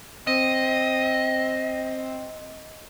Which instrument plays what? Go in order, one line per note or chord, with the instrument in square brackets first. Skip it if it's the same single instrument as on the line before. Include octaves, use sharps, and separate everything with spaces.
[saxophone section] C4 [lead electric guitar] D#5